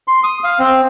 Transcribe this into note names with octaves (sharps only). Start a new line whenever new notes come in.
C6
D#6
F5
C4